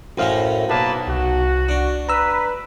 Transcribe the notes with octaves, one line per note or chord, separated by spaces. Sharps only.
F#2 A2 C#4 F#4 C5 F5
B1 A#3 B4 A5
C2 F#4
D4
B4 A#5 E6